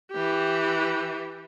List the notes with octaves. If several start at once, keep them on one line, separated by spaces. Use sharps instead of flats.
E3 G4